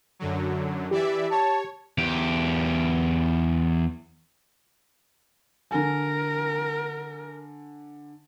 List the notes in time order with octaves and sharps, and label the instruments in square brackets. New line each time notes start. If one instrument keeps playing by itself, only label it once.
[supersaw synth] F#2 D3 F#3
[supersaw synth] E3 D5 E5 [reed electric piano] G4
[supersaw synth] C#5 [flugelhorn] A5
[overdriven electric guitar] E2 G4
[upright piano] D3 G#5 [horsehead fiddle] A#4